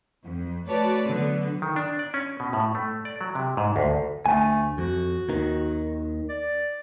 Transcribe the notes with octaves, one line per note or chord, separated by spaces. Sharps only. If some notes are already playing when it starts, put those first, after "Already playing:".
F2
A3 F#4 B4 C#5 D5 A5
D3 F#3 B3
D#3
D4
D5
C#4
B2
A2
A3
D5
F#3
C3
G#2
D2
D2 A3 G#5
F2 F#4
D#2 D#3
D5